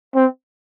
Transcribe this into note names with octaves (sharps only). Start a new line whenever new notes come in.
C4